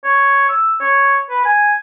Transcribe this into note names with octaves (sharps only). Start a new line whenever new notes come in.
C#5
E6
C#5
B4
G#5